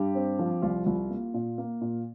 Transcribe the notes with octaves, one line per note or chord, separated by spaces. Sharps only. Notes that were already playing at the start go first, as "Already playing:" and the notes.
Already playing: G2 G4
C4
F3
C2 F4
C2 F4
A#3
A#2
A#3
A#2